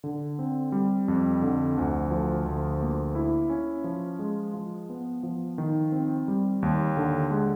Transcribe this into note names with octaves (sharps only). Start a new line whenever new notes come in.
D3
C4
G3
F2
D3
D2
F3
D2
A#3
E4
C#4
F3
G#3
F3
B3
F3
D#3
C4
G3
D#2
D3
G#3